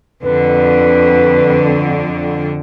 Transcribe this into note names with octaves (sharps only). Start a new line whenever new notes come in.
F2 D3 B4